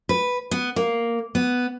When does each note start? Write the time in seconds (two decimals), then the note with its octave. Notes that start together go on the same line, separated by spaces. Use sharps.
0.09 B4
0.51 B3
0.76 A#3
1.35 B3